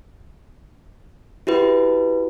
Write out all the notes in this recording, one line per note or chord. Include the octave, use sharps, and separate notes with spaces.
E4 F#4 G4 B4